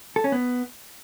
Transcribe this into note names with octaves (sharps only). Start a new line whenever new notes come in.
A4
C#4
B3